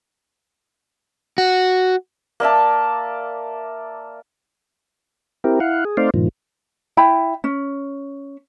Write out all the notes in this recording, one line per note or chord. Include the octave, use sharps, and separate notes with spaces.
F#4
A#3 D5 E5 A5
C4 E4 G4 A#4
E4 F5 F#5
G#4
A3 C4 D#4 C5 D5 F5
G2 A#2 D#3 F3
E4 G5 B5
C#4